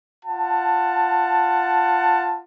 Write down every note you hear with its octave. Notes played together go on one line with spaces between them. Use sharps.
F4 F#5 A5